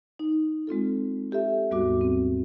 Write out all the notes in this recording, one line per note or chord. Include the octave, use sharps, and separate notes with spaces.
D#4
G#3 C4 F4 A4
F4 G4 A4 E5
D#2 G#2 G3 B3 F#4 D6
C4